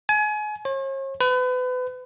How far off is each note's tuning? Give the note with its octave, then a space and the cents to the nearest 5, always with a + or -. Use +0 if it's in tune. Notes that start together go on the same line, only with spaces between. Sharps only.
G#5 +30
C#5 -45
B4 +35